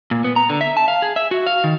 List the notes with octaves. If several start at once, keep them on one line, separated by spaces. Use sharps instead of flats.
A#2
B3
A#5
D3
E5
A5
F5
G#4
E5
F#4
F5
D#3